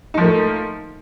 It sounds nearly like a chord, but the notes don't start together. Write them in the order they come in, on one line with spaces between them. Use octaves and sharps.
D#4 F3 A#3 A3